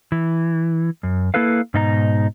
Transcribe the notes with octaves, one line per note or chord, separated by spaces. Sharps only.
E3
F#2
A#3 E4 A4 B4 F5
G#2 B2 D#4 G4 A#5